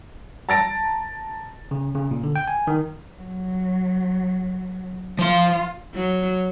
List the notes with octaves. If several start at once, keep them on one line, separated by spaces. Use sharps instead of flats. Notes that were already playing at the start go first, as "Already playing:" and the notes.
A5 A#5 A6 A#6 D7
C#3
C#3
A#2
D3
G5
G#5
D#3
F#3
F3 F4 C6
F#3